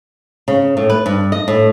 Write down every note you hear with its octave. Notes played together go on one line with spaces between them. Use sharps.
C#3
A2
B4
G2
D#5
A2